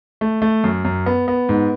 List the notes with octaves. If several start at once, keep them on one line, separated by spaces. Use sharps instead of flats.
A3
A3
F#2
F#2
B3
B3
G#2